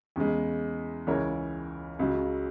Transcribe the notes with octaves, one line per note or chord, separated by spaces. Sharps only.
E2 C#3 G#3
C#2 C#3 E3 A#4 C#5
C#2 C#3 F#3